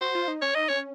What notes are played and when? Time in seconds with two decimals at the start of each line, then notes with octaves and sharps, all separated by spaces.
0.01 F#4 C5
0.15 F4
0.28 D#4
0.42 C#4 C#5
0.55 D#4 D#5
0.68 C#4 C#5